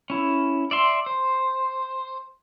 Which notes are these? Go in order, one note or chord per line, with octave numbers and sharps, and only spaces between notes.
C#4 E4
D5 E5 C6
C5